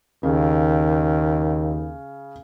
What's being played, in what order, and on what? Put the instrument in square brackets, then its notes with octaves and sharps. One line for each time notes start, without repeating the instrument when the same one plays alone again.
[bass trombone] D#2 [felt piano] C#3